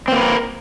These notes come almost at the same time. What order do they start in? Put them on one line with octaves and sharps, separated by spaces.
C4 A#3 B4 A#4